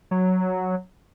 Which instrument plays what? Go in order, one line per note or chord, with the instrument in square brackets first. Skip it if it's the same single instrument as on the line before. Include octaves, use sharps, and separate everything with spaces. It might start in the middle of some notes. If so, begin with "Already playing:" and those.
[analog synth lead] F#3